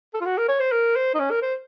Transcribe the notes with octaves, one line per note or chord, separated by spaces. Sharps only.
A4
F4
F#4
A#4
C#5
C5
A#4
C5
D#4
C#4
A#4
C5